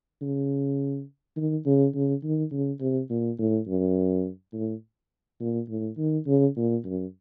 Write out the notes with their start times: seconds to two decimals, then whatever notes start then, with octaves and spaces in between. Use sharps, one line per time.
0.22 C#3
1.37 D#3
1.66 C#3
1.94 C#3
2.24 D#3
2.52 C#3
2.80 C3
3.10 A#2
3.39 A2
3.68 F#2
4.53 A2
5.41 A#2
5.69 A2
5.98 D#3
6.27 C#3
6.56 A#2
6.85 F#2